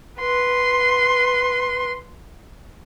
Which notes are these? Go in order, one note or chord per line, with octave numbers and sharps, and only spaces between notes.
B4 C6